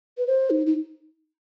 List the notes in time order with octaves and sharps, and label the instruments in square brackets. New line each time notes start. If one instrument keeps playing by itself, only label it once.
[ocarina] B4
C5
D#4
D#4